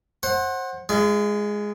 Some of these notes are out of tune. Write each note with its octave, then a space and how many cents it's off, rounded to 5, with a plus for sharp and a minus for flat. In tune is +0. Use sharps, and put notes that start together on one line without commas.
C5 +30 F#5 +0
G#3 +0 F4 -40